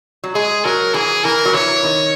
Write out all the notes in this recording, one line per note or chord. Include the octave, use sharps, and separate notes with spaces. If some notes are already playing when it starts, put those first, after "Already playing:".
F#3
G#3 G#4
F#3 A#4
E3 G#4
E3 A#4
F#3
E3 C#5
D#3